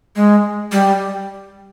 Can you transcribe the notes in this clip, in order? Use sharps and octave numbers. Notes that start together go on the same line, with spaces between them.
G#3
G3